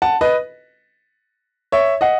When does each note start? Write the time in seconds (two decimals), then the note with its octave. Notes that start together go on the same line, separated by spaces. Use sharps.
0.02 F#5 A5
0.21 B4 D#5
1.72 C#5 E5
2.01 D#5 F#5